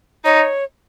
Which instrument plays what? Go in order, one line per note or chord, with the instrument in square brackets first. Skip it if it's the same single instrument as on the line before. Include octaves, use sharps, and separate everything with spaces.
[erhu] D#4 [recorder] C#5